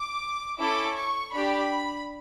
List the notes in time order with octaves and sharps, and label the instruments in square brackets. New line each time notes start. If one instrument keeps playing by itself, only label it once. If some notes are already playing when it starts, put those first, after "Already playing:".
Already playing: [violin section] D6
C#4 E4 A4 D6
C#6
D4 G4 B5